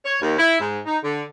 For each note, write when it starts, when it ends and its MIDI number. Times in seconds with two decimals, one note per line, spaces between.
0.05 0.17 73
0.21 0.38 39
0.38 0.60 64
0.60 0.79 44
0.86 0.97 63
1.04 1.23 50